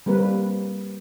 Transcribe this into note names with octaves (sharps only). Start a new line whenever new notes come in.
G3 A#3 C4 A#4 B4